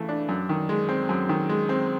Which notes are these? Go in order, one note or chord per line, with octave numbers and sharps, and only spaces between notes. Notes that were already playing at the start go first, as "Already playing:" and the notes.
Already playing: C#3 E3 A3
D4
F#2
D#3
G#3
C4
F#2
D#3
G#3
C4